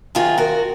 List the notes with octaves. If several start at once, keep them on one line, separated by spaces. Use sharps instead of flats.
C3 D#3 F#3 F4 G#4
F#4 A#4